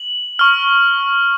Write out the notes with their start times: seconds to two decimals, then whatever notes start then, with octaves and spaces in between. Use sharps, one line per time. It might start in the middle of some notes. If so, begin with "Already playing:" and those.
Already playing: F#7
0.39 C#6 F6